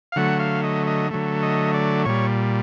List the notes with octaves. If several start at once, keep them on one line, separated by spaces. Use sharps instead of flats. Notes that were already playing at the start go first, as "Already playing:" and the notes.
F5
D3 F#3 A3 F#5
F5
D#5
D#5
D3 F#3 A3
D#5
D5
A#2 G3 C#5